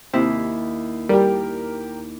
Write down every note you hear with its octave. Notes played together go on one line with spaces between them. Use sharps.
D#2 C3 E4
G3 G4 A#4